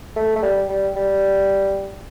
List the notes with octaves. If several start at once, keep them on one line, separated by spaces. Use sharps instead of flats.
A3
A3
G3
G3
G3